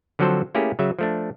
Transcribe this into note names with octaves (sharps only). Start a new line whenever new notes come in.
D3 F3 F#3 C4 A4 C5
A3 A#3 C#4 E4 G4 G#4
C#3 F#3 E5
F3 A3 D4